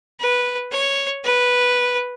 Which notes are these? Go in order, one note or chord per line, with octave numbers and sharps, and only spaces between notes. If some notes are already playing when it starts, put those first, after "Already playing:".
B4
C#5
B4